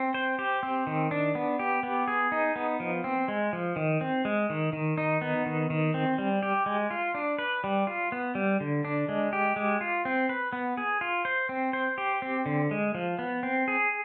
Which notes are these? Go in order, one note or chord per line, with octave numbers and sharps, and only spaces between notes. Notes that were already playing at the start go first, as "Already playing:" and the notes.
Already playing: C4
C5
G4
C4
D#3
D4
B3
G4
B3
G#4
D#4
B3
F3
C4
G#3
F3
D#3
C4
G#3
D#3
D#3
D#4
B3
D#3
D#3
C4
G3
G4
G#3
F4
D4
B4
G3
F4
B3
G3
D3
D4
G#3
G4
G#3
F4
C4
B4
B3
G#4
F4
C5
C4
C5
G4
C4
D3
G#3
F3
B3
C4
G#4